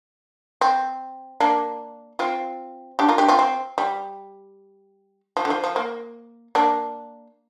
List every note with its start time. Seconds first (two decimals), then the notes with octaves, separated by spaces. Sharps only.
0.61 C4
1.40 A#3 D4
2.19 C4 F4
2.99 D4 G4
3.08 F4 A#4
3.18 D4 G4
3.28 C4 F4
3.39 C4
3.78 G3
5.37 F3
5.45 D3
5.50 F3
5.64 F3
5.76 A#3
6.55 A#3 D4